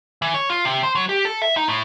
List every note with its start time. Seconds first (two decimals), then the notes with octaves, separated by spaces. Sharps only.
0.22 E3
0.34 C#5
0.50 F4
0.65 C3
0.83 C5
0.95 F#3
1.09 G4
1.25 A4
1.42 E5
1.57 D#4
1.69 A2